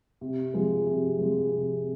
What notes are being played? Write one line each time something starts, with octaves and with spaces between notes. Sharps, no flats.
C3
F3 G#3
C3
F3 G#3
C3